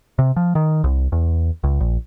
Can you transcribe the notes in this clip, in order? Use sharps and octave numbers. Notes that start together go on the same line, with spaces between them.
C3
F3
D#3
C2
E2
C#2
A#1